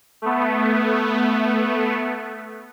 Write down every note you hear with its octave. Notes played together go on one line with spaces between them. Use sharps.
A3 B3